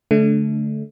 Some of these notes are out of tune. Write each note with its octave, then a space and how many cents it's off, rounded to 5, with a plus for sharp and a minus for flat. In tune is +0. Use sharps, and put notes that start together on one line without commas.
D3 -25 A3 -20 D4 +0